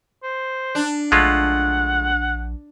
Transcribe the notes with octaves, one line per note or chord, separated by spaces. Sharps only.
C5
D4
A#1 G#3 A3 F4 F#5